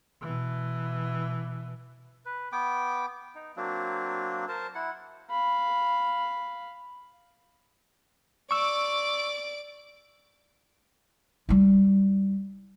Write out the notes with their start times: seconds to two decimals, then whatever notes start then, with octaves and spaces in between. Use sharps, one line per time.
0.21 B2 E3
2.25 B4
2.52 B3 G5 D6
3.35 D#4
3.56 F#3 A#3 C4 D4
4.48 A#4 C5 A5
4.75 E4 F#5
5.30 F5 B5
8.51 D5 C#6 D6 E6
11.49 G3 E4